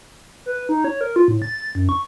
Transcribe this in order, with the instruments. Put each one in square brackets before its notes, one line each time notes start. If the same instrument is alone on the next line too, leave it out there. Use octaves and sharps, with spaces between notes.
[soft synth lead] B4
D#4
C#5
A#4
F4
A2
A6
F#2
C#6